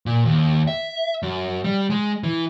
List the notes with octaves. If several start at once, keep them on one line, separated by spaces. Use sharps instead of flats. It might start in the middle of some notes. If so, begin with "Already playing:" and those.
A#2
D#2
E5
F#2
G3
G#3
E3